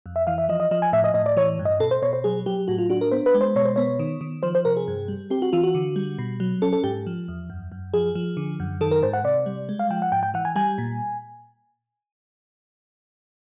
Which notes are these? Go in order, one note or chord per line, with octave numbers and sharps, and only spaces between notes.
F2
E5
E3 F5
E5
F3 D#5
D#5
F3 D#5
G#5
A2 E5
D#5
A2 D#5
D5
E3 C#5
G2
D#5
B2 A4
C5
B2 C#5
C5
F#3 G#4
F#3 G4
A2 F#4
F4
D4 F#4
A#4
B3 C5
B4
G#3
C5
B2 C#5
C5
B3 C#5
D#3
D#3
F3 C5
C5
C3 A#4
G#4
G2
G3
C4 G4
F#4
E3 F4
F#4
D3
G3
B2
F#3
C#4 A4
A4
G#2 G4
F3
E2
F#2
F#2
F3 G#4
F3
D3
F#2
D#3 A4
A#4
G#2 C5
F#5
C3 D5
G3
G#3
F5
F3 G5
F#5
G#2 G5
G5
E3 F#5
G#5
G3 G#5
A#2